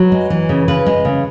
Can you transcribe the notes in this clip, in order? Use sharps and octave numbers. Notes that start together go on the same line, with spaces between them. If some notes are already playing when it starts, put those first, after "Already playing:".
Already playing: F#3 B4
G#3
E3
C#3
C#3 B4
G#3
C#3